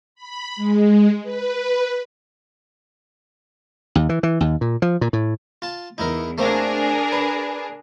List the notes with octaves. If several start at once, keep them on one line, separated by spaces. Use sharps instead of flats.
B5
G#3
B4
D#2
E3
E3
D#2
A#2
F3
A#2
A2
F4 A5
E2 D#4 E4 A#4
A3 A#3 C4 D4 G#4 A#4
B4